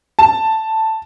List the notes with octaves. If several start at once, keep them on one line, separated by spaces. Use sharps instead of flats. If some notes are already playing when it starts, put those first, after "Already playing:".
A5